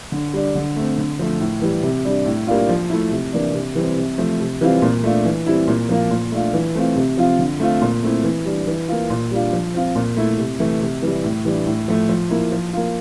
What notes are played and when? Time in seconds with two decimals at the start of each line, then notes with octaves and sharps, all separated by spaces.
0.12 D3
0.33 G3 D4
0.55 D3
0.76 A3 C4
0.98 D3
1.19 F3 A3
1.40 A2
1.62 E3 G3
1.83 C3
2.05 G3 D4
2.26 A2
2.47 G3 A#3 D4 F4
2.69 F3
2.90 A3 E4
3.11 C3
3.33 E3 A#3 D4
3.54 C3
3.75 E3 G3 C4
3.97 C3
4.18 F3 A3
4.40 C3
4.61 E3 G3 C4 F4
4.82 A#2
5.04 A3 D4 F4
5.25 E3
5.46 G3 C4 E4
5.68 A#2
5.89 F3 A#3 F4
6.10 A#2
6.32 A3 D4 F4
6.53 E3
6.75 A3 C4 F4
6.96 C3
7.17 F3 C4 F4
7.39 D3
7.60 A3 C4 F4
7.82 A#2
8.03 A3 C4 E4
8.24 E3
8.46 G3 D4
8.67 E3
8.88 A#3 F4
9.10 A#2
9.31 G3 D4 F4
9.53 F3
9.74 C4 F4
9.95 A#2
10.17 A3 E4
10.38 C3
10.60 E3 A3
10.81 C3
11.02 E3 G3
11.24 A2
11.45 E3 G3 D4
11.66 A2
11.88 F3 A3
12.09 F3
12.30 A#3 E4
12.52 F3
12.73 A#3 F4